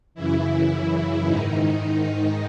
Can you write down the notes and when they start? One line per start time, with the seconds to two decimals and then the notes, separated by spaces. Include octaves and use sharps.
0.15 F#2 C#3 E3 E4
1.25 G#2 D#3 D#4